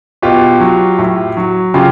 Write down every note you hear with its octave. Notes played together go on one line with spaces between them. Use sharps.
B2 F4 G4
F#3
A2
F#3
C#3 F4 G4